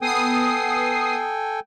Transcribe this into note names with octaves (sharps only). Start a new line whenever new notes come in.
B3 A4 G5 G#5 D#6 C7